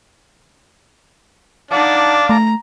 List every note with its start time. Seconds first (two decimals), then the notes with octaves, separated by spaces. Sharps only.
1.71 D4 D#4 F5 F#5 A5 D6
2.29 A3 A#5